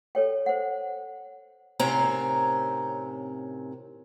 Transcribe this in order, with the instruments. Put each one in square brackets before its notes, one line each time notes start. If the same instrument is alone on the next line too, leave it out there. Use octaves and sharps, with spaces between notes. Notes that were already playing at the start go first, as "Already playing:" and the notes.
[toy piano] A4 C#5 G5
C5 F#5
[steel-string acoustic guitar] A2 C3 D#3 C4 C#4 A#5